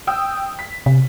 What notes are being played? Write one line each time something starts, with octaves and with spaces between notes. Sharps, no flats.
G5 D#6 E6
B6
C3